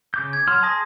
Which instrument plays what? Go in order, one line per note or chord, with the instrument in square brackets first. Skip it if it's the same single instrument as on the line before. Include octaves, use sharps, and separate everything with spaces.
[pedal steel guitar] C#3 D6 G6
[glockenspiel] G#6
[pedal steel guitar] F#3 F6 [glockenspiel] C6
[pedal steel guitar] G#4 [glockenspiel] A5 D#6 A#6